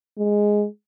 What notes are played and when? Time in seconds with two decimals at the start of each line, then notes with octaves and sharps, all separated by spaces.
0.18 G#3